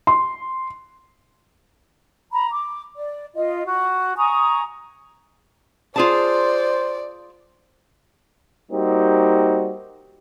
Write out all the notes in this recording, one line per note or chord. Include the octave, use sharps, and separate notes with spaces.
C6
A#5 B5
D6
D5
F4 D#5
F#4
G#5 A#5 C#6 D#6
F4 G#4 C5 D5 A5
G3 A#3 C4 D#4 F#4 G4